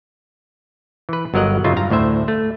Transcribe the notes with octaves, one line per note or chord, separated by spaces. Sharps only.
E3 B4
G1 F#3 A#4 D#5 F#5
F#2 C#3 D#4 F4 E5
G2 F5 A#5
D2 A2 C5 E5
A3